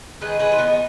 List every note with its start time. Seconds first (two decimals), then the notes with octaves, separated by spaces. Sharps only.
0.21 D#3 G#3 B3 G#4 B4
0.40 G#4 B4
0.52 F4
0.58 B3 D#4